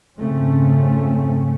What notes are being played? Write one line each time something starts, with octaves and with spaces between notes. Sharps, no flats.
F2 G#2 C#3 A3 C4 C#4